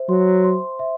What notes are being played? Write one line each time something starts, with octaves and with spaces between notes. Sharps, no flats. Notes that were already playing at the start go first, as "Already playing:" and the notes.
Already playing: C5 E5
F#3 C6
C6
E5